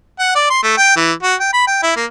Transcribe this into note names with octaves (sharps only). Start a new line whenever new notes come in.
F#5
D5
C6
A3
G5
E3
F#4
G5
B5
G5
E4
A#3